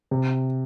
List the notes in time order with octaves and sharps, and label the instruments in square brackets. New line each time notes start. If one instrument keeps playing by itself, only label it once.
[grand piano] C3